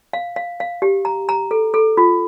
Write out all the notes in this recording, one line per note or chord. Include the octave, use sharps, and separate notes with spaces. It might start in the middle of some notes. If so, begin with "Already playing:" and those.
F5
F5
F5
G4
A#5
A#5
A4
A4
F4